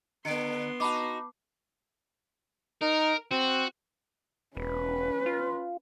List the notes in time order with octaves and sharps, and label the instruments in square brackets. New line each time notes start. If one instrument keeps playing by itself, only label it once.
[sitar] D3 [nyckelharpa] B3 C6 [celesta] C#7 D7
[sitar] D#4 F#4 [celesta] A5 B5 D6
[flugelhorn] D#4 [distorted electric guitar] A#4
[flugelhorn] C4 [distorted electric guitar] F#4
[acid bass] E1 [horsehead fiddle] C#4 B4
[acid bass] F4